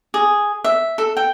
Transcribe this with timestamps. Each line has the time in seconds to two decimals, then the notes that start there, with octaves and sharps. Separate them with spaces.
0.14 G#4
0.64 E5
0.98 A4
1.17 G5